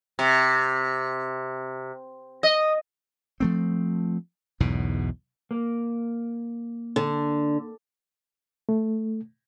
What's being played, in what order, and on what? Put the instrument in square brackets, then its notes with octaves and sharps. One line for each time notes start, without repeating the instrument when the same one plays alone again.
[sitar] C3
D#5
[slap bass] F3 A3 C4
B1 E2 G#2 B2
[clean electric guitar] A#3
[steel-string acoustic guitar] D3
[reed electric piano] A3